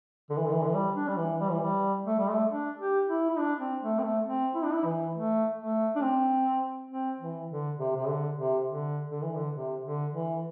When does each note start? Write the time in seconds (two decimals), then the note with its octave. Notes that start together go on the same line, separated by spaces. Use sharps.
0.30 D3
0.37 E3
0.46 D3
0.53 E3
0.61 D3
0.68 E3
0.74 G3
0.95 D4
1.08 G3
1.17 E3
1.40 G3
1.51 E3
1.61 G3
2.06 A3
2.19 G3
2.30 A3
2.50 D4
2.78 G4
3.08 E4
3.30 E4
3.38 D4
3.60 C4
3.82 A3
3.99 C4
4.04 A3
4.26 C4
4.55 E4
4.64 D4
4.73 E4
4.84 E3
5.14 A3
5.58 A3
5.96 D4
6.02 C4
6.91 C4
7.20 E3
7.49 D3
7.79 C3
7.95 C3
8.08 D3
8.37 C3
8.67 D3
9.11 D3
9.23 E3
9.35 D3
9.54 C3
9.84 D3
10.13 E3